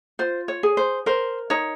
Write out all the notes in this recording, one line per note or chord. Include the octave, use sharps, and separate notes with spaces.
F4 C5
C#5
G#4
C5
A#4 C5
D#4 C#5